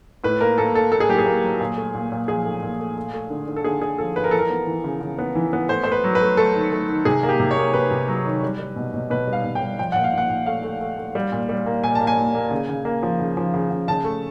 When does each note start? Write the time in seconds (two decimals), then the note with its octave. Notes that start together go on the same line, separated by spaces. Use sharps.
0.24 A2 B4
0.41 A#3 A#4
0.58 A#3 A4
0.74 A#3 A4
0.92 A#3 A4
1.00 G#4
1.09 F#3 G4
1.19 G#4
1.26 A#3
1.44 F#3
1.60 A#2
1.77 A3
1.94 A#2
2.12 A#2
2.28 F3 G#4
2.45 A3
2.63 A#2
2.80 A3
2.97 A3
3.14 A3
3.30 D3
3.47 D3
3.56 A4
3.64 D3 G#4
3.82 D3 G#4
3.98 F3 A4
4.16 F3 B4
4.24 A#4
4.31 E3 A4
4.39 A#4
4.50 B3
4.67 E3
4.84 C#3
5.01 C#3
5.18 B3
5.35 E3
5.53 B3
5.69 A3 C5
5.84 A3 C5
5.92 B4
6.04 F#3
6.15 B4
6.21 A3
6.37 A3 A4
6.55 D#3
6.72 A3
6.89 D#3
7.05 C3 G#4
7.23 A#3
7.29 G4
7.40 C3
7.51 C#5
7.57 A#3
7.73 C3 B4
7.91 C3
8.08 F#3
8.25 D#3
8.43 G3
8.59 G3
8.76 B2
8.94 B2
9.10 B2 B4
9.28 G3
9.33 F5
9.44 B2
9.55 G5
9.62 G3
9.79 F3 G5
9.92 A#2 F#5
10.04 F5
10.13 A#2 F#5
10.29 A#2
10.46 A3 F5
10.63 A3
10.81 A3
10.98 A3
11.15 G3
11.32 A#2
11.49 G3
11.66 A#3
11.84 A#2 G#5
11.95 A5
12.01 A#3
12.07 G#5
12.17 A#2
12.35 A#3
12.51 C#3
12.69 C#3
12.85 A#3
13.03 F3
13.19 C#3
13.37 F3
13.54 C#3
13.71 C#3
13.88 C#3 A5
14.04 A3